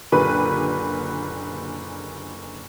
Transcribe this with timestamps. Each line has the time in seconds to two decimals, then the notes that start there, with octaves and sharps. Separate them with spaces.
0.12 F#1 A#2 D3 G4 B4